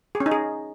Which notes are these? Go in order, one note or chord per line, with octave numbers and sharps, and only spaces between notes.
G#4
C#4
D#4
G#4